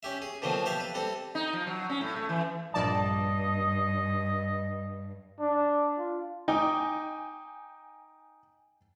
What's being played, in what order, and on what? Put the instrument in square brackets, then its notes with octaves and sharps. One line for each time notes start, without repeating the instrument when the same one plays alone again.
[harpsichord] C#4 G4 E5
G#4
B2 D3 F3 F#3 A#3 C4
G4 C5 E5 F5 A5
B4
G3 C4 A4
[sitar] D#4
F3
F#3
C#4
A2
A3
E3
[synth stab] A#1 D5 A5 [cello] G2 [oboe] D#5
[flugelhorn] D4
F4
[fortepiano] D#4 [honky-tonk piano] G5 G#5 D6